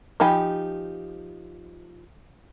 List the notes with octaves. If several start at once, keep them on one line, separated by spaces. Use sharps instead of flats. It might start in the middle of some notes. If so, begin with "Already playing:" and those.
F3 D#4 G4 G#5 B5